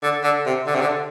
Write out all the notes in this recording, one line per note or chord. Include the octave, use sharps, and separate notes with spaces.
D3
D3
C3
D3
C3
D3